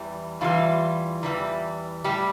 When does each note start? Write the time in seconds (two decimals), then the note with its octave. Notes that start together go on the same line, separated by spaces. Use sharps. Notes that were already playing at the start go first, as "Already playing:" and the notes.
Already playing: E2 E3 G3
0.41 E2 E3 G3 F4
1.23 E2 E3 G3
2.04 A2 G3 G4